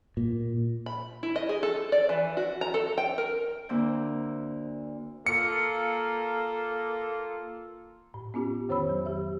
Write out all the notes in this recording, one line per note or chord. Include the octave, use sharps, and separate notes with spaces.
A#2
B5
E4
D#5
G#4
A4
D5
E3
F#4
A#5
A4
G5
A#4
D2 A#3 C4 E4 G6
A#3 F4 A4 C#7
A2
B3 C#4 F4 G4
F2 D#3 C5 C#5 B5 E6
F#3
G4 E5